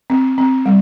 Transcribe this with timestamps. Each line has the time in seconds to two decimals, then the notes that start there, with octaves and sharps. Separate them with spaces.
0.10 C4
0.38 C4
0.66 G3